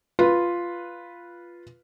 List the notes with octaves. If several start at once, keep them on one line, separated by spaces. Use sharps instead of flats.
F4 B4